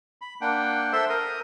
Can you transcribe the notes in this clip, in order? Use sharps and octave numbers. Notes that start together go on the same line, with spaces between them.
B5
A#3 D4 F#5 G5
A4 C5 E5 C6 E6
A#4 D#6